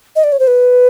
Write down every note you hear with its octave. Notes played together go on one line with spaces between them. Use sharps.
D#5
D5
C#5
C5
B4